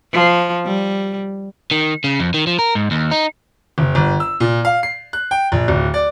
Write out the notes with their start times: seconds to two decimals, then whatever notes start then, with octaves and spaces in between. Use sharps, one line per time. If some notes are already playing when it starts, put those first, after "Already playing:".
0.13 F3
0.65 G3
1.71 D#3
2.04 C#3
2.20 F2
2.34 D#3
2.47 F3
2.59 A#4
2.75 G#2
2.91 D#2
3.11 D#4
3.78 F#1
3.95 G1
4.20 E6
4.40 A#2
4.65 F5
4.83 C7
5.13 F#6
5.31 G5
5.52 A#1
5.68 D1
5.94 D5